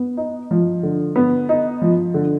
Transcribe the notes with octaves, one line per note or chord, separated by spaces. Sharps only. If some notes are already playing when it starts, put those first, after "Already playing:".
Already playing: B3
D#4
F3
D3
B3
D#4
F3
D3